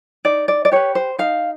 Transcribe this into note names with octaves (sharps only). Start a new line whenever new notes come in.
D#4 D5
D5
D5
G4 B4 C#5
C5
D#4 F5